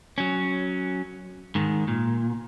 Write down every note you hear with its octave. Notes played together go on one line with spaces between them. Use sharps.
F#3 C#4
G#2 D#3
A#2